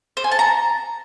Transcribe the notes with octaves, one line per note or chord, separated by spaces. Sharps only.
C5
G#5
A5
A#5